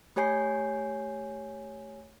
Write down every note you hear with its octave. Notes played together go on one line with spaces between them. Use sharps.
A3 G4 C#5 G#5 G6 C7